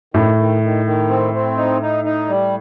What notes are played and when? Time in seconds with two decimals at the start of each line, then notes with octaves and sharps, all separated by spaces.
0.14 A2 D#3
0.37 D#3
0.62 D#3
0.85 D#3
1.09 C4
1.33 C4
1.57 D#4
1.82 D#4
2.04 D#4
2.28 G3